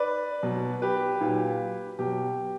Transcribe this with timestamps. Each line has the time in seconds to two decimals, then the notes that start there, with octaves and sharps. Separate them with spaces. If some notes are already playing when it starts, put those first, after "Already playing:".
Already playing: B4 D5
0.43 B2 F#3
0.82 G4 B4
1.21 A#2 F#3
1.99 B2 F#3 G4